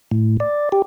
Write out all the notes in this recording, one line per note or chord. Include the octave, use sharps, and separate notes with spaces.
A2
D5
G4